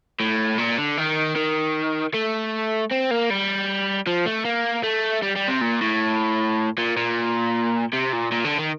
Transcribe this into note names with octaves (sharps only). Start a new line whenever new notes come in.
A2
A#2
D3
D#3
D#3
A3
C4
A#3
G3
F3
A3
A#3
A3
G3
G3
C3
A#2
A2
A#2
A#2
C3
A#2
A#2
D3
D#3